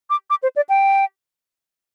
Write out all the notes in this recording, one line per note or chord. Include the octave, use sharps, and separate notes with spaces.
D6
D6
C5
D5
G5